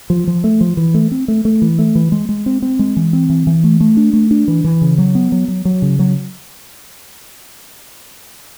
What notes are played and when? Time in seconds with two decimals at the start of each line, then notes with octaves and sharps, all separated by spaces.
0.10 F3
0.27 F3
0.44 A3
0.61 F3
0.77 E3
0.94 A3
1.11 C4
1.28 A3
1.45 A3
1.62 E3
1.79 A3
1.95 E3
2.12 G#3
2.29 G#3
2.46 C4
2.62 C4
2.79 G#3
2.97 E3
3.13 C4
3.30 E3
3.47 E3
3.64 A3
3.81 A3
3.97 D4
4.13 A3
4.31 D4
4.48 E3
4.64 E3
4.82 C#3
4.98 F#3
5.15 B3
5.32 F#3
5.48 F#3
5.65 F#3
5.82 C#3
5.99 F#3